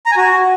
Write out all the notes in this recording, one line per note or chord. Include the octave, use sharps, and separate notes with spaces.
A#5
G#5
F#4